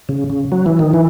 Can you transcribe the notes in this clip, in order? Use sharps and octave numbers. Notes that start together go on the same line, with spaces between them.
C#3
C#3
F#3
E3
D#3
E3